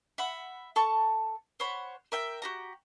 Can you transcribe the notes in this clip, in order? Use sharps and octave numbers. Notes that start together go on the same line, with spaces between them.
E5 F#5 B5
A4 A5 C#6
C5 C#5 F#5 B5
A#4 E5 G5
F#4 G4 A#5